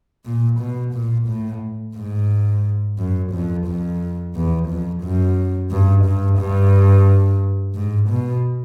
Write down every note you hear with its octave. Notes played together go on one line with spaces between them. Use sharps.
A#2
B2
A#2
A2
G#2
F#2
F2
F2
E2
F2
F#2
G2
G2
G2
G#2
B2